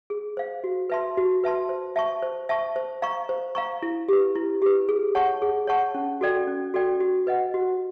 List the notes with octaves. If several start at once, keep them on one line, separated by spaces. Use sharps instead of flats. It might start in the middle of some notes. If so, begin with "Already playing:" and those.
G#4
C5 F5
F#4
B4 E5 A5 C6
F#4
B4 E5 A5 C6
C5
E5 A5 C#6
C5
E5 A5 C#6
C5
F5 A#5 C#6
C5
F5 A#5 C#6
E4
G4 B4
E4
G4 B4
G#4
C#5 F#5 A5 C#6
G#4
C#5 F#5 A5 C#6
C#4
F#4 A4 D5 G5
C#4
F#4 A4 D5 G5
F#4
B4 D#5 F#5
F#4